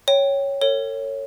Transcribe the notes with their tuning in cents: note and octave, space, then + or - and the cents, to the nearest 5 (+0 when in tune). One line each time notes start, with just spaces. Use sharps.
C#5 +0 G5 +0
A4 +45 C#5 -5